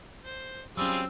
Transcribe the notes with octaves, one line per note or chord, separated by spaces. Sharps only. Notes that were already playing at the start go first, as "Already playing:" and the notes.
C5
F#3 G3 C4 C#4 F4 G#4 E6